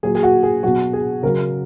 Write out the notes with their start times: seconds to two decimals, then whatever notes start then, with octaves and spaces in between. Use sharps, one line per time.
0.03 A#2 F#3 G#4
0.15 G#4
0.23 F#4
0.43 G#4
0.63 B2 F#3 F#4
0.93 G#4
1.23 C#3 F#3 A#4